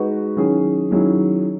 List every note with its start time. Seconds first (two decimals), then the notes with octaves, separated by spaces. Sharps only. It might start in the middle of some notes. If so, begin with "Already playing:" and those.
Already playing: G#3 D#4 F#4 B4
0.37 D#3 F#3 C#4 E4 G#4
0.91 D#3 F#3 C#4 E4 G#4